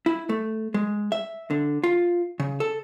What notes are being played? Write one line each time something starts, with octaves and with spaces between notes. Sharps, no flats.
E4
A3
G#3
E5
D3
F4
C#3
A4